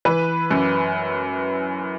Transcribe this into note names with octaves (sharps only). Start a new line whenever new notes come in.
E3 B4
F#2